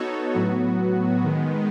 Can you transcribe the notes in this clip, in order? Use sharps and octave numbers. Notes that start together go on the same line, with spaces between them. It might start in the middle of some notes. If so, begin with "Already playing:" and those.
Already playing: B3 D#4 F#4 A4 C#5
A2 F#3 B3 F#4
D#3 G#3 B3